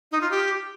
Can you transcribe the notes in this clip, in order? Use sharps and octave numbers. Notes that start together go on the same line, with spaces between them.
D#4
F4
G4